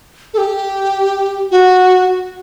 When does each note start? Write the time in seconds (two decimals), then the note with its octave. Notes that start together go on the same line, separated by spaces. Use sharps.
0.34 A4
0.38 G4
1.51 F#4